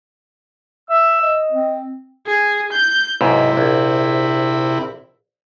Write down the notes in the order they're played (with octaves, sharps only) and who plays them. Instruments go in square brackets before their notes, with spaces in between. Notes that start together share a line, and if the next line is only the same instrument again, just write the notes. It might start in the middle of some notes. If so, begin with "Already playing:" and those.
[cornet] E5 [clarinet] E6
[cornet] D#5
[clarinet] C4
[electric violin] G#4
G6
[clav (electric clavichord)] B1 G#2 [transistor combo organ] C3 E4 B5
[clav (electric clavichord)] A#1